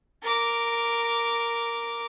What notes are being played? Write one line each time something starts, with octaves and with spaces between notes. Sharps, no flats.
A#4 D6